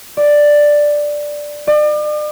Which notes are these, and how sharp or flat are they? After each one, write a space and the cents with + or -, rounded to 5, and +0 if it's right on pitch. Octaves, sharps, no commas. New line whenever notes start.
D5 +5
D5 +40